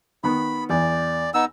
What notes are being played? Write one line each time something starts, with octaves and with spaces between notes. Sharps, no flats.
D#3 B3 B5
E2 D5
B3 D#4 E6